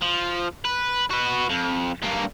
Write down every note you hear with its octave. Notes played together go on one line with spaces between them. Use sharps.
F3
B4
F#4 B4
F2
G2 A#3